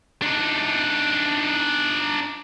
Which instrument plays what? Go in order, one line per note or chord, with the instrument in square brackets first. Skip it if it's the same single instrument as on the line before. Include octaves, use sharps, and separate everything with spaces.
[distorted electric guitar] D4 D#4